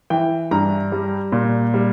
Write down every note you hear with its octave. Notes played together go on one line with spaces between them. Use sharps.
E3 G5
G2 A#5
G3
A#2
G3